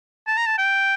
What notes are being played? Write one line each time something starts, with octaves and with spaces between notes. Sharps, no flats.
A5
A#5
A5
G5